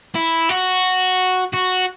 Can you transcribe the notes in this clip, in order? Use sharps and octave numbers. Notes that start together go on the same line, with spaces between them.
E4
F#4
F#4